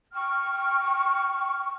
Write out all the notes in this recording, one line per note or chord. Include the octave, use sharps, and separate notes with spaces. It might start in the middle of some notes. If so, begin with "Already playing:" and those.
G5 C#6 F6